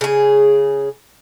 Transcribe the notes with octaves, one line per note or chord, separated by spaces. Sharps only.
C#3 G#4